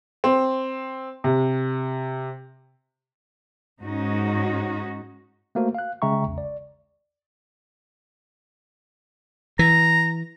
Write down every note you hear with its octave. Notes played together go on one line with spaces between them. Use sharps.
C4
C3
G#2 C#4 D#4 F#4
A3 A#3 F#4 C5
F5 F#6
C#3 G#3 E5 G5 A#5 C#6
A#1 E2
D5
E3 A#5